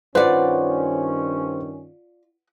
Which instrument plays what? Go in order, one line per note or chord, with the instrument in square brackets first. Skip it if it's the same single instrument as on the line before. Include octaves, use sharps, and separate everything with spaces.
[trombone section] G2 D#3 C#4 [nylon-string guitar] F4 D5 [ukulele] B4 F#5 [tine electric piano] C5